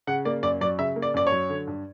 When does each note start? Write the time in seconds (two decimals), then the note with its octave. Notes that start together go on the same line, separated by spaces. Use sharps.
0.07 C#3 F#5
0.25 A#3 D5
0.43 F#2 D5
0.61 F#3 D5
0.79 C#3 E5
0.96 A#3
1.02 D5
1.14 F#2 D5
1.27 C#5
1.32 F#3
1.50 D3
1.67 G2